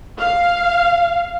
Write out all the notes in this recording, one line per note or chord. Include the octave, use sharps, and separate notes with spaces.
F5